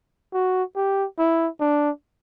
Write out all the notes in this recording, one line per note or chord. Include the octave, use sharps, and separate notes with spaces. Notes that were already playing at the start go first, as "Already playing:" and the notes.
F#4
G4
E4
D4